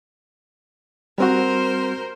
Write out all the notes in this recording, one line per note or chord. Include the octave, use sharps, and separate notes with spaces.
G3 C4 F#4 A#4 C5